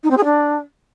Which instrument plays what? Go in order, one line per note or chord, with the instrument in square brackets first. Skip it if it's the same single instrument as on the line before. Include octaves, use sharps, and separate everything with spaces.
[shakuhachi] D#4
C4
G#4
D4